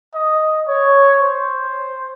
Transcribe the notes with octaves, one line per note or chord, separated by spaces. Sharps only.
D#5
C#5
C5